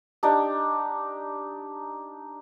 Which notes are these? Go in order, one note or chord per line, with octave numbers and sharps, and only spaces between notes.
D4 D#4 G4